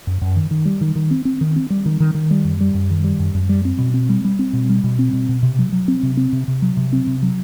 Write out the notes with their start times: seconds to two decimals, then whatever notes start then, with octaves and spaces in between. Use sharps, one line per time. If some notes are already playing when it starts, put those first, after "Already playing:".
0.07 F#2
0.22 F#2
0.36 D#3
0.51 D#3
0.65 G3
0.81 D#3
0.96 D#3
1.11 C4
1.25 C4
1.41 D#3
1.56 C4
1.70 G3
1.86 D#3
2.00 D#3
2.15 D#3
2.31 G3
2.45 F#2
2.61 G3
2.74 F#2
2.90 D#3
3.04 G3
3.20 F#2
3.35 F#2
3.49 G3
3.65 C4
3.79 B2
3.94 C4
4.09 G3
4.25 G3
4.39 C4
4.53 B2
4.69 G3
4.84 B2
4.99 C4
5.13 B2
5.29 B2
5.43 C3
5.59 F#3
5.73 F#3
5.88 C4
6.03 C3
6.17 C4
6.33 C3
6.48 C3
6.62 F#3
6.77 C3
6.93 C4
7.07 C3
7.23 F#3